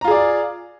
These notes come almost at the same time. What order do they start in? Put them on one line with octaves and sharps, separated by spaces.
A#5 F4 G#4 D5